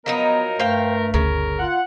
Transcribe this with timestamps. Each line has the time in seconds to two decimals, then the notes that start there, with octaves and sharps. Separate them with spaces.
0.06 F3 F#3 B3 D#4 A#4 D#5
0.60 G2 A3 C5 F5 G5
1.14 G1 D2 C#3 A#4
1.59 F4 F#5